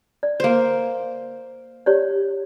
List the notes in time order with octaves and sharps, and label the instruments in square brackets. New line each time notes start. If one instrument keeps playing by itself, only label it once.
[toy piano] D5
[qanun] A#3 C5
[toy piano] G4 C#5 D5